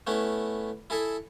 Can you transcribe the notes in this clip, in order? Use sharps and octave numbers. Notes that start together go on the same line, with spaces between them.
A3 B3 C#4 E4
E4 G#4 A4 E5